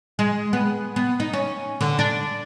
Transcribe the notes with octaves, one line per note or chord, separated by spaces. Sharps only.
G#3
B3
B3
D#4
C#4
D3
D4